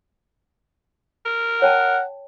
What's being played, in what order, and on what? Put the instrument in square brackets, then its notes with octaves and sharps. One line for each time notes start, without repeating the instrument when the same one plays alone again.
[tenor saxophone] A#4
[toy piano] C#5 G5 A5 [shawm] F#5